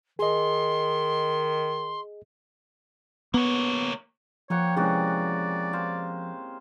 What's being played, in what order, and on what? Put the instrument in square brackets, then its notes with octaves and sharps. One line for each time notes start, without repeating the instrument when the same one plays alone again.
[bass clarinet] D#3 [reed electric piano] G#4 D#5 [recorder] C6
[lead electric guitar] A#3 C#5 [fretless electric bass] B3
[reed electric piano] F3 [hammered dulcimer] A#3 F#5 G5 [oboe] C#5
[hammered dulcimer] C3 E3 F#4 [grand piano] G#3 C#4 [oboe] D5
[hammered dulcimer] C5 F5